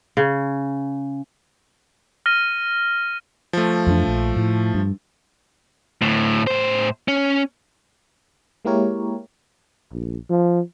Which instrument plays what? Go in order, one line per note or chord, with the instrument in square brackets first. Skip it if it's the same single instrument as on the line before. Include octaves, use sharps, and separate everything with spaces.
[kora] C#3
[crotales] F6 A#6 D#7
[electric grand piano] F3 A3
[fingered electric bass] F2 E3 D4
A#1
A2
G2
[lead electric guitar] D2 A2
A2 C5
C#4
[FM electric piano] G#3 A#3 E4 G4 A#4 C#5
[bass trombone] A#1
F3